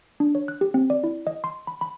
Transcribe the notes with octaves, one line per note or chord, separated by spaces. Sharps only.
D4
C#5
F#6
G4
C4
D5
E4
D#5
C6
B5
B5